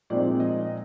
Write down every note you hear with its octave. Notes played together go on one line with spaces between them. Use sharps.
A#2 F3 G#3 C4 D#4 D5
D#5